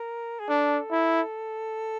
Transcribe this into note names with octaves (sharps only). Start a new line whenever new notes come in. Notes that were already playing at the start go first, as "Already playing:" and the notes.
Already playing: A#4
G#4
D4 A4
E4